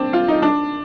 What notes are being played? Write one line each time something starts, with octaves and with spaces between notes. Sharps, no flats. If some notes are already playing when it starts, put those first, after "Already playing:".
Already playing: C4 D4
F4
D#4
D4